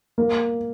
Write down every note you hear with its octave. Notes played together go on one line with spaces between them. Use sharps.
A#3